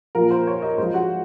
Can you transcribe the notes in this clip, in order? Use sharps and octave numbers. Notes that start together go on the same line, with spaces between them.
A#2 F3 A#4
C5
C#5
D#5
G#2 F3 C5
F#4